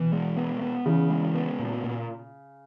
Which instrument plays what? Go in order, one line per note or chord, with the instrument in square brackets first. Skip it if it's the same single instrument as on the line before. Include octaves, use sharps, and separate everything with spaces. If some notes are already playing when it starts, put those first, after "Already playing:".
Already playing: [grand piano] B2 [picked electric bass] E3
[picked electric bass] G#3
B3
B3
[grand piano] C#3 [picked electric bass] E3
[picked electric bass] G#3
B3
A#2
A#2